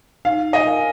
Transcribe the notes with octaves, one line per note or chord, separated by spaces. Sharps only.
D#4 F5
D#5
A#4 F5 G#5